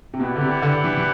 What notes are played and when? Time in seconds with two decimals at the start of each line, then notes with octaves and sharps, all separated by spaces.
0.14 C3
0.20 B2 E4 G4 B4 D5 F#5
0.36 D3
0.41 C3
0.62 D3
0.84 E3
0.97 E3